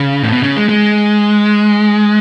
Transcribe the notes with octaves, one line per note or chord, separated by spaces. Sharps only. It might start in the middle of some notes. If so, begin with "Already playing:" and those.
Already playing: C#3
A2
B2
C#3
G#3
G#3